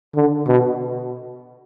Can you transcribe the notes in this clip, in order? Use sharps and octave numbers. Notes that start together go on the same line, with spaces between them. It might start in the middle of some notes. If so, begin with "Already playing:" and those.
D3
B2